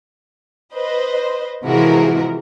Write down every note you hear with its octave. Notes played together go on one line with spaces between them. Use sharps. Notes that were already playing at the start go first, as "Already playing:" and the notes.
B4 C5 D#5
C3 E3 F3 G#3 F#4 A#4